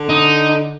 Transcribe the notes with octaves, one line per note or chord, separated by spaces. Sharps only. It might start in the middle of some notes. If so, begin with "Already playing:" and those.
Already playing: D3
D#4